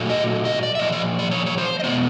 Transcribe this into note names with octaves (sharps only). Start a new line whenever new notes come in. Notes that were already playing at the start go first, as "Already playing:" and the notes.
Already playing: A#2 F#3 A3
D#5
D#5
D5
E5
A#2 F3 D#5
D5
D5
C#5
C#5
C5
D#5
B2 G#3 B3 D5